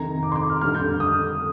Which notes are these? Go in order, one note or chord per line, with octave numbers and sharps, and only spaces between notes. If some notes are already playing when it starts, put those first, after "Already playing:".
Already playing: F2 C3 D#3 A#5
D6
C6
D6
F6
F2 D3 G3 F6
G6
F6
D#6